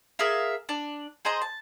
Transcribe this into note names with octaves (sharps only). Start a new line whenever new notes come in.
G#4 A#4 E5 F5
D4 D5
G#4 C5 D#5 A#5
A5